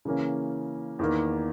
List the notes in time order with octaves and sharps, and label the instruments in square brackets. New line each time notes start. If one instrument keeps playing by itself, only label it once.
[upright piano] C#3 E3 A#3 C#4
E2 D#3 A#3